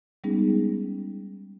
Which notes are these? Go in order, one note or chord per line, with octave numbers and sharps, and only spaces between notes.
G3 G#3 B3 C#4 D#4 G#4